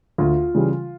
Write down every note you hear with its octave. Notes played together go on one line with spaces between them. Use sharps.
D2 F4
C#3 E3 G3